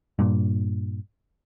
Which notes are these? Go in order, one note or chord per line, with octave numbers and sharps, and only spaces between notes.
G2 A#2